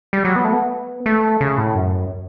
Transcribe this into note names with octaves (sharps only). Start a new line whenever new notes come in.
G3
F#3
B3
A3
B3
A3
C#3
A2
F#2